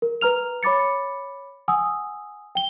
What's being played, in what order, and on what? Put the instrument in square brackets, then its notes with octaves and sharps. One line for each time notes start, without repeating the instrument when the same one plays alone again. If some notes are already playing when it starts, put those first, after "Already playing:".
[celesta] A#4
B4 A#5 F6 F7
C#5 B5 D6 A6 C#7
F#5 G#5 D#6 E6
G5 G7